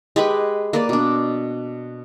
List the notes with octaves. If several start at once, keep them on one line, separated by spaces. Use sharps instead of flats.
G#3 G4 B4 B5
A#3 B4 D5
B2 D4